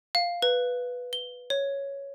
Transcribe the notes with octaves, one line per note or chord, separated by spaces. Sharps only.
F5
B4
G7
C#5